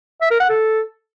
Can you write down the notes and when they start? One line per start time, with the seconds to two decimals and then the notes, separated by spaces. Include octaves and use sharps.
0.21 E5
0.31 A#4
0.40 F#5
0.49 A4